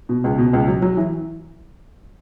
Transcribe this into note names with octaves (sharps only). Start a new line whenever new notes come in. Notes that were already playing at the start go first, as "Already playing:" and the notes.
B2
C#2
B2
C#2
F#3
F#3
E3